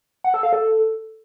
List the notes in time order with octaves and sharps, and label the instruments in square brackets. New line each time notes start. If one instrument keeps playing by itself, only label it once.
[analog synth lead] F#5
A4
F5
A4